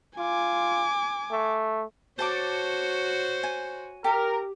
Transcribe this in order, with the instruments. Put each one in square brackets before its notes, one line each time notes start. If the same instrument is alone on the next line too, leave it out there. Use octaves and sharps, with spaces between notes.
[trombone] F4 [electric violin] G#5 D6
[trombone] A3
[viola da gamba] F#4 C#5 [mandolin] A4 A5 D6 [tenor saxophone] C5
[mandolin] G#5
[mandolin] G4 [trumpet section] A#4